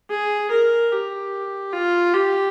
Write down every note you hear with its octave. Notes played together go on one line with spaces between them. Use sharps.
G#4
A#4
G4
F4
G4